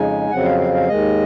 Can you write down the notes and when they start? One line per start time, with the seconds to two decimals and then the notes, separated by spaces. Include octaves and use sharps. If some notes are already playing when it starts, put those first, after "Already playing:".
Already playing: F2 C#3 G#3 D#4 G#5
0.30 F2 C#3 F#3 C4 F#5
0.44 F5
0.59 F5
0.74 F5
0.88 D#2 D#3 G#3 D#5